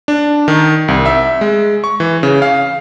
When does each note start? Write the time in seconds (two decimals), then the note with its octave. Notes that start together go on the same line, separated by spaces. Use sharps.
0.08 D4
0.48 D#3
0.88 C2
1.06 E5
1.41 G#3
1.84 C#6
2.00 E3
2.23 C#3
2.42 F5